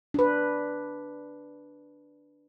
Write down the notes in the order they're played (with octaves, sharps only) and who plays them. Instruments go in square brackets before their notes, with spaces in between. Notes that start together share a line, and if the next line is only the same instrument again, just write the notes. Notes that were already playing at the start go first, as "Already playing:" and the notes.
[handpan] D4 B4